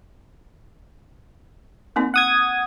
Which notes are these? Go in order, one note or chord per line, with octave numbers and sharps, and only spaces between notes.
A#3 C4 D#4
F#5 D#6 G#6